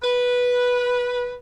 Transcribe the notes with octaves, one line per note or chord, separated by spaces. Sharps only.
B4